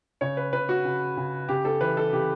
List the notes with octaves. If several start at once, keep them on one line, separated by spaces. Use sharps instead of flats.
C#3 C#5
B4
C#3 B4
F#4
C#3
C#3
C#3 G4
A4
E3 B4
A4
C#3 G4